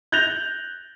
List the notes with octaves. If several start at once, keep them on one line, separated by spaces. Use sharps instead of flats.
F#6 G6 A6 A#6 F7